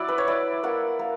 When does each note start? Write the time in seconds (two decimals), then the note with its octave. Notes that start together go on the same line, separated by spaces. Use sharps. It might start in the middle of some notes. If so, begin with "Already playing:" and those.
Already playing: F#3 E4 D5 E5 F#5
0.08 B4
0.18 C#5
0.28 E4 D5
0.63 A#3 F#5
0.99 A#3